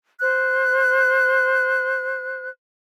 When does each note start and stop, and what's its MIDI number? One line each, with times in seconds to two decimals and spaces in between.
0.20 2.49 72
0.20 2.49 90